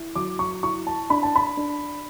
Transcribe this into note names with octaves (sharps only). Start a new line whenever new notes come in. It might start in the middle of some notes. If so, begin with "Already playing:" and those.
Already playing: E4
F#3 D6
C#6
E4 C#6
A5
D4 B5
A5
B5
D4